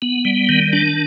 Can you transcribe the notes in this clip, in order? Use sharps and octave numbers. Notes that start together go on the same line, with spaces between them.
B3
G3
D#3
D4